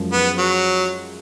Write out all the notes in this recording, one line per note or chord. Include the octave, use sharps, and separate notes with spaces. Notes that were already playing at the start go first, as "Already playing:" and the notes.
Already playing: F#2 F3 G#3
B3
F#3